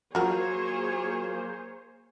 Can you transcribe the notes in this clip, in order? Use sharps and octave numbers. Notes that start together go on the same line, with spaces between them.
F#3 A#3 F4 F#4 G#4 A#4 C5 C#5